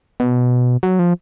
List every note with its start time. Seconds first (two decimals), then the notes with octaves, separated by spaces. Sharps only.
0.20 B2
0.83 F#3
0.99 F3